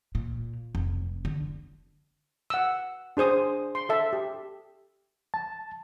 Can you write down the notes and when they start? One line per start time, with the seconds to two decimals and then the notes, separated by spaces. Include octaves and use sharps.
0.15 A#2
0.75 F1
1.25 D3
2.50 F#5 E6
3.17 D4 G#4 C5 D#6
3.75 C6
3.89 A4 E5 A5
4.13 G4
5.34 A5